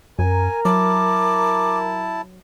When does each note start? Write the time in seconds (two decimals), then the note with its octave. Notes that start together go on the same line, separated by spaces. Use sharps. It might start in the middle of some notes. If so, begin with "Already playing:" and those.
0.19 F#2 A#4 G#5 A#5
0.65 F#3 E4 A5 D6